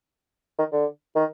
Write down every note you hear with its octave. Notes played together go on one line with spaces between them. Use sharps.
D#3
D3
D#3